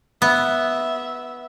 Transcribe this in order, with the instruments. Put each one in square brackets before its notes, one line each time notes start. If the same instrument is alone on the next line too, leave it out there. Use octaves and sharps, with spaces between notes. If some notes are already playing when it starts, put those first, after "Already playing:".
[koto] B3 [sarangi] E5